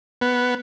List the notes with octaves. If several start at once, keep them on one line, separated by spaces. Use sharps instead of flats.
B3